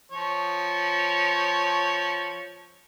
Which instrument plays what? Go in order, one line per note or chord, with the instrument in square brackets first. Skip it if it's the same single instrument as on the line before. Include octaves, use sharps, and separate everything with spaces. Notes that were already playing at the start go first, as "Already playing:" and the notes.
[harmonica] F3 C#5